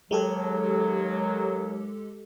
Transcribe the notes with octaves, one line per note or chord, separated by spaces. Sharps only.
D#2 F#3 G#3 G4 A4